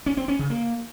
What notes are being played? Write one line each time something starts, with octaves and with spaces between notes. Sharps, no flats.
C#4
C4
C#4
C#3
A#3